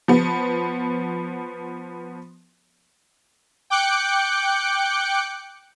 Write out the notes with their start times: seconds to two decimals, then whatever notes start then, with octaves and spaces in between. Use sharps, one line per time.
0.08 F3 B3
3.70 G5 D6 F#6 G6 C#7